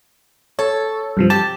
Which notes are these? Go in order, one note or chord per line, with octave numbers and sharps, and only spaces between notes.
A4 C#5
G2 C3 F3
G4 A5